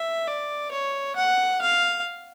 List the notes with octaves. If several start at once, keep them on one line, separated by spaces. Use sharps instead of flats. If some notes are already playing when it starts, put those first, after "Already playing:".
Already playing: E5
D5
C#5
F#5
F5